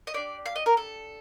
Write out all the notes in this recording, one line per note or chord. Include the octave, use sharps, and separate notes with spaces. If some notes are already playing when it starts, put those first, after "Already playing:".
D#5
D4 G4 D5
F5
D#5
A#4
A4